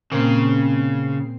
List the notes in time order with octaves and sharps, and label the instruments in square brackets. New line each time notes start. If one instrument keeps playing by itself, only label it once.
[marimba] A#2 A#3 [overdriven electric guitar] C#3 [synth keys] C4 C7